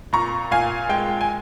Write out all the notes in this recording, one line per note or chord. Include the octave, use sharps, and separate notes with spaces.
A#2 A#5 C#6
A#2 F5 G#5
G#3 G5
G#5